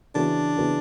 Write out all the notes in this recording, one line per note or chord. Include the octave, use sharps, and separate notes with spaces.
C#3 E3 B3 D4 F#4
C#3 E3 B3 F#4